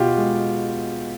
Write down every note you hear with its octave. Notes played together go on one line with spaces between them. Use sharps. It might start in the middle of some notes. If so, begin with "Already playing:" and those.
Already playing: B2 F4 G4
G#3